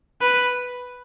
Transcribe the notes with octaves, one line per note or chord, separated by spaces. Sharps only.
B4